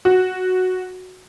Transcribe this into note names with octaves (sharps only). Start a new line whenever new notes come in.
F#4